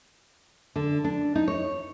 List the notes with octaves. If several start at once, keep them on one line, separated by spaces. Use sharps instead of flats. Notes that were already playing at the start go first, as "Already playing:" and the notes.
D3
D4
D#4
C#5